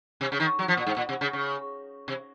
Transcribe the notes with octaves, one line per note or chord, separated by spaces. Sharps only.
C3
C#3
D#3
F#3
F3
A#2
G#2
A#2
C3
C#3
C#3
C3